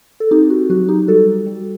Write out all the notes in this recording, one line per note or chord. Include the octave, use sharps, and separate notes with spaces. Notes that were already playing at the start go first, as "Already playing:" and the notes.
A4
C4 D#4 G4
F#4
F#3 F#4
D#4 G4
G3 F#4 A4
G3